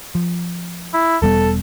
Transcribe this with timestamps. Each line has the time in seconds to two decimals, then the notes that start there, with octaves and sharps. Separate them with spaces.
0.15 F3
0.94 E4
1.22 E1 G3 B3 A4